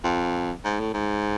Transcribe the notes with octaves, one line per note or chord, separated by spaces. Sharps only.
F2
G#2
A2
G#2